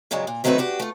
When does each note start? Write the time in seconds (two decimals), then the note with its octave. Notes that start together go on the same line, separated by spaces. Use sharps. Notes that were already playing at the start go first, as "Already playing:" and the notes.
0.11 G2 A#2 C#3 F#3 G#3
0.27 A#2
0.44 D#3 F#3 A3 C4 F#4 B4
0.58 D4 F#4 G4
0.80 A3 F4